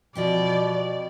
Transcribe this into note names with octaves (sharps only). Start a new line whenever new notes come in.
B2 F3 C4 G4 D5